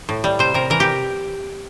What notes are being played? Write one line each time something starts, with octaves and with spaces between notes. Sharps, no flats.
A2
G3
C3 C5
C3 A#4
E3 A#4
G4